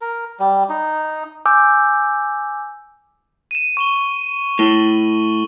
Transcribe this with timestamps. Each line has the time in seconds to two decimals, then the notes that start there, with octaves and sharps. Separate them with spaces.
0.01 A#4
0.39 G3
0.69 D#4
1.46 G#5 D6 E6 G6
3.51 D#7 E7
3.77 C#6 E7 G7
4.59 A2 F#7 G7